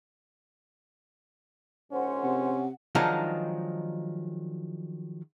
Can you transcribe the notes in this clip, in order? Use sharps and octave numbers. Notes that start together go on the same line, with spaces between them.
A#1 G#2 C#4 C5 F#5
C3
D#3 F3 F#3 G#3 D4 D#4